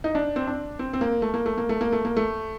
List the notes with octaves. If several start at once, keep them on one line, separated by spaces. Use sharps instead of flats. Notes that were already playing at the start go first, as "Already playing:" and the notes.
D#4
D4
C4
D4
C4
C4
A#3
A3
A#3
A3
A#3
A3
A#3
A3
A#3
A3